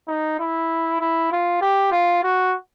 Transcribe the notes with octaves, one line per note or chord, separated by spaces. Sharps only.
D#4
E4
E4
F4
G4
F4
F#4